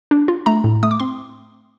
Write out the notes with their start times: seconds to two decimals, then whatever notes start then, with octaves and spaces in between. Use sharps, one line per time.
0.11 D4
0.28 F4
0.46 A3 A#5
0.64 A2
0.83 A3 D#6
0.91 D6
1.00 C4 C6